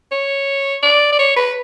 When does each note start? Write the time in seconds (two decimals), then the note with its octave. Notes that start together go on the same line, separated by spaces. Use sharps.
0.11 C#5
0.82 D5
1.12 D5
1.18 C#5
1.36 B4